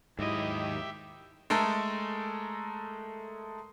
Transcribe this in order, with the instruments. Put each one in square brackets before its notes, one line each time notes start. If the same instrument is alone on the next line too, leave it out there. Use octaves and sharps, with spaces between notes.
[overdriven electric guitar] D#2 D#5 [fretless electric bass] G#2 F#3 [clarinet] E4 [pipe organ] G4 E5
[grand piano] G#3 A3 A4 A#4